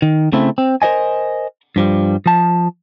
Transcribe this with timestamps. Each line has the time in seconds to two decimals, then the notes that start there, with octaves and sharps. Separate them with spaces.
0.02 D#3
0.32 C#3 A3 C4 E4
0.58 C4
0.82 A#4 C5 D#5 G#5
1.76 G2 F3 G3
2.26 F3 A5